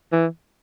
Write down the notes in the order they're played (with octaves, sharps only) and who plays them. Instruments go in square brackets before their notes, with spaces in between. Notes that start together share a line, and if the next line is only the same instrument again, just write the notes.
[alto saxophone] E3